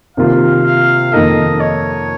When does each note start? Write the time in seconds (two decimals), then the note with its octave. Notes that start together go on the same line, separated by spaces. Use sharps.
0.17 C3 D#3 A#3 F4 F5
0.65 F5
1.12 F2 D#3 A#3 D#4 A4 D#5
1.60 C#5